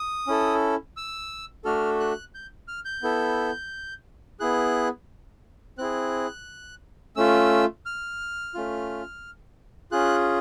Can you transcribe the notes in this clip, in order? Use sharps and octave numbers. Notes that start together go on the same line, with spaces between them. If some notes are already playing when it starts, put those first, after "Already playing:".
Already playing: D#6
C#4 E4 A4
E6
A3 D4 F#4 A4 F6
F#6
G6
F6
G6
B3 E4 A4
B3 E4 G#4 F#6
C4 E4 G#4 F#6
A3 C#4 F4 E6
F6
A3 C#4 F4
C#4 F4 G#4 F#6